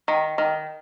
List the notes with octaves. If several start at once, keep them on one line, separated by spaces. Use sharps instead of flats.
D#3
D#3